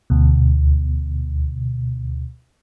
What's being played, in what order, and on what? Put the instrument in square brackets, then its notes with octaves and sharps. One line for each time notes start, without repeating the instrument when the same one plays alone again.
[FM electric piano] D2 B2